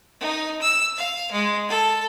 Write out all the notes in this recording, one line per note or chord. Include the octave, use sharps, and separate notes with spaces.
D#4
E6
F5
G#3
A4